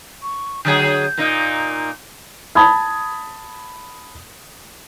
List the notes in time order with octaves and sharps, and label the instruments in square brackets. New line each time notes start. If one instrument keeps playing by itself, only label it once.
[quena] C#6
[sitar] D3 F#3 G#4 [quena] G6
[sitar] A#2 A#3 D#4
[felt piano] A5 B5 D#6 G#6